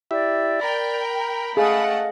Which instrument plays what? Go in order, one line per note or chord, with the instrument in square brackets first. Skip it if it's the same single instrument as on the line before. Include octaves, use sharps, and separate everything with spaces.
[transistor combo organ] E4 G4 E5 [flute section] D5
[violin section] A#4 G5 [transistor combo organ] B5
[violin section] A3 F#5 [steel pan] G#4 [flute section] D#5 F5